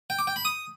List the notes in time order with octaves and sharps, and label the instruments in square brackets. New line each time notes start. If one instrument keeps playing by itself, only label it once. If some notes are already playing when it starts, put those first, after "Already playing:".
[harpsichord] G5
D6
G5
B5
D#6